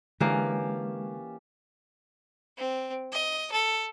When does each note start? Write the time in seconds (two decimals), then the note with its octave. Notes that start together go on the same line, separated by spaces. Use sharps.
0.20 D3 E3 G#3 A#3 C#4 G4 A5
2.57 C4
3.12 D#5
3.52 A4